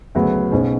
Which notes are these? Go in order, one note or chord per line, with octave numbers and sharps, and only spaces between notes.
D2 C#3 F#3 B3
B1 B2 G#3 C#4 C5